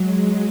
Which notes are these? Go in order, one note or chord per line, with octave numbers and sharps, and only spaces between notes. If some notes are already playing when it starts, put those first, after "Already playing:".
Already playing: F#3 G#3